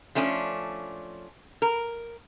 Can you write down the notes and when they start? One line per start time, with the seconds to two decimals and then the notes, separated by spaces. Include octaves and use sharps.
0.15 F3 A3 C#4 D4
1.62 A#4